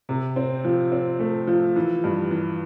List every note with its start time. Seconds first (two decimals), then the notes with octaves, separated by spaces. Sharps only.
0.09 C3
0.36 C4
0.65 F3
0.92 C4
1.19 A3
1.47 F3
1.76 E3
2.04 G2
2.31 E3